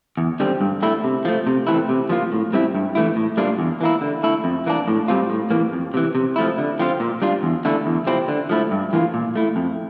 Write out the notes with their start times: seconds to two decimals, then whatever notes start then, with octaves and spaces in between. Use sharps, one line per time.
0.17 E2
0.40 D3 G3 C4
0.61 G2
0.82 D3 A3 E4
1.04 C3
1.25 F3 A3
1.47 C3
1.67 E3 A3 C4 E4
1.89 C3
2.09 F3 A#3 F4
2.32 A2
2.53 G3 C4 E4
2.75 G2
2.95 E3 A3 E4
3.16 A2
3.37 G3 A#3 D4 F4
3.59 E2
3.81 E3 A#3 E4
4.01 D3
4.23 A3 E4
4.44 F2
4.66 E3 A#3 D4
4.88 A2
5.08 G3 C4 F4
5.30 A2
5.51 E3 A#3
5.72 F2
5.94 C3 E3
6.15 C3
6.36 F3 A3 E4
6.58 D3
6.79 F3 C4 F4
7.00 A#2
7.22 G3 D4 F4
7.43 E2
7.65 D3 A3 E4
7.86 E2
8.07 C3 F3 C4 E4
8.28 D3
8.49 F3 A3 E4
8.71 G2
8.93 E3 A#3 F4
9.14 A#2
9.36 A3 E4
9.56 F2